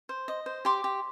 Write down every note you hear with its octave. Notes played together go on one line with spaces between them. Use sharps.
C5
D#5
C5
G4 C6 D6
G4